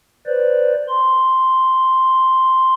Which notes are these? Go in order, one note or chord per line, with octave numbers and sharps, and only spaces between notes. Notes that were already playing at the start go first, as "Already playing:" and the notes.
B4 C5 D5
C6